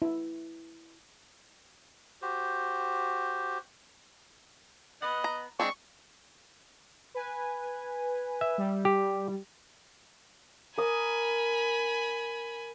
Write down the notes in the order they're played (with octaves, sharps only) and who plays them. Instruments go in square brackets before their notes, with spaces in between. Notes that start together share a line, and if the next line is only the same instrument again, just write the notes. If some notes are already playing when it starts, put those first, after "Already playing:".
[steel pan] E4
[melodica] F#4 G4 C5
[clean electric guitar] B3 B4 F#5 [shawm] D#5
[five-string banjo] A#5
[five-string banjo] G#3 C4 D4 [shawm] C#6
[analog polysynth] B4 G#5
[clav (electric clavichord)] E5
[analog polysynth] G3
[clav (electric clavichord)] G4
[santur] A#4 D#6 [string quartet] G#5 B5